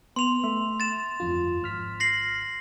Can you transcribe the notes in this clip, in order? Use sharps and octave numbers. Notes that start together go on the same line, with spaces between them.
B3 C6 F7
A3 E5
A6 E7
G1 F2 F4
G#1 F6 B6
A#6 C7 F#7